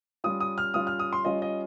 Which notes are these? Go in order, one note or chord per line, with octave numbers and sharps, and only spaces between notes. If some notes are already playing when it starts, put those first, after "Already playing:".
G3 C#4 F4 D#6
D#6
F6
G3 C#4 F4 D#6
F6
D#6
C6
G3 C#4 F4 D#5
D#5